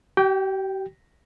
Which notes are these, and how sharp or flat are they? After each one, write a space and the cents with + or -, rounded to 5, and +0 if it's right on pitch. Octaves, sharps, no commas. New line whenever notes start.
G4 -40 G5 +0